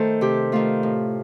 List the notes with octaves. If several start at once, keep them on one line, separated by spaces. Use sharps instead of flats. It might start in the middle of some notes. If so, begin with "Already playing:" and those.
Already playing: D#3 A3 A4 C5
C3 G4
D#3 A3 F4
A2